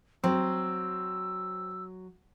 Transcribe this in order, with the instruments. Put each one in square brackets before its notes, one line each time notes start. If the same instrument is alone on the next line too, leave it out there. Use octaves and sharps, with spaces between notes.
[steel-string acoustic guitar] F#3 [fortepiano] C4 [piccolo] E6